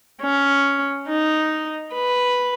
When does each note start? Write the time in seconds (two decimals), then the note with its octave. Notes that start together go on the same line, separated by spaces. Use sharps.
0.23 C#4
1.09 D#4
1.95 B4